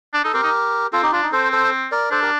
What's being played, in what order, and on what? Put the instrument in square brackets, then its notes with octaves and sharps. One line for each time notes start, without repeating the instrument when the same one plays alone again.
[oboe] D4
[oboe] D#4 [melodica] A4
[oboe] C4 [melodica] G4 A#4
[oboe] D#4
[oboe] C4 [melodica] F4 A4
[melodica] D#4 G4
[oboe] D4 [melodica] F4
[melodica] D#4
[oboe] C4 [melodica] A4 C5
[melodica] A4 C5
A#4 D5
[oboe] D4 [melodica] A4 C5
[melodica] G4 A#4